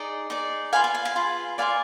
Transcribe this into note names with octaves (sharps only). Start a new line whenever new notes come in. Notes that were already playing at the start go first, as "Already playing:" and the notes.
Already playing: D#4 G#4 D5 D#5
D#4 G#4 D5
F4 G#4 B4 F5 G#5
F5 G#5
F5
F5 G#5
F4 G#4 B4
F4 B4 D5 F5 G#5